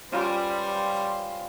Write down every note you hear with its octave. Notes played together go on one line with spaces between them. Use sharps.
G3 C#4 F4 B4 C5 C6